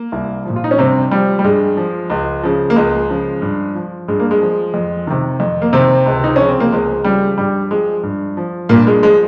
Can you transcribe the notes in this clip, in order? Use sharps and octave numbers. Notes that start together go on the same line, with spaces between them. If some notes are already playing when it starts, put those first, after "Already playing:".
Already playing: A#3
C2
A#2 F3
F4
D#4
C#4
G2 C3 C4
F3 G3
G3
G2 G#3
F3
C#2
C#3 F3
A#3
C#2 G#3
C#3 F3
G2
F3
G2 G#3
A#3
G#3
F3
F2
C3 D#3
F2
A#3
C3 D#3 C4
C#2
D#4
C#3 F3 C#4
C4
A#3
C#2 G#3
C#3 F3 G3
G2 G3
F3 G#3
G2
F3
G2 A#2 A#3
G#3
F3 G#3